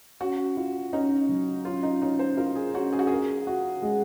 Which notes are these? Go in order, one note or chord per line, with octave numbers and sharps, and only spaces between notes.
C#4 F#4
F4
C#4 D#4
F#3
C#4 F4
D#4
C#4 D#4
C5
F4 A#4
G#4
C#4 F#4
G#4
F#4
G#4 A#4
F#4
G#3